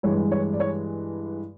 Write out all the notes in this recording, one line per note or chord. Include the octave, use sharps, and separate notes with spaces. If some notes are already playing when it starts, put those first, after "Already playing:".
G2 E3 G#3 C#5
C#5
D5
C#5